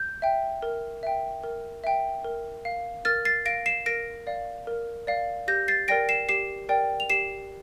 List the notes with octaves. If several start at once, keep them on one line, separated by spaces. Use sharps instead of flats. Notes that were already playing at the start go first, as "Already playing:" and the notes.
Already playing: G6
E5 G5
A#4
E5 G5
A#4
E5 G5
A#4
F5
A#4 F6 A6
A6 C7
F5 A#6 D7
C7 E7
A#4 A#6 D7
D5 F5
A#4
D5 F5
G4 G6 A#6
A6 C7
A#4 D5 G5 A#6 D7
C7 E7
G4 C7 E7
A#4 D5 G5
F7
G4 C7 E7